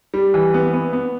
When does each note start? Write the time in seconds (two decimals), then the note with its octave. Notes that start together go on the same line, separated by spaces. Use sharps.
0.14 G3
0.34 E3
0.54 B3
0.73 B3
0.93 B3